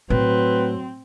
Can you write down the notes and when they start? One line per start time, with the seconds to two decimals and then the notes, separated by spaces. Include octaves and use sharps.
0.10 A2 F#3 C4 B4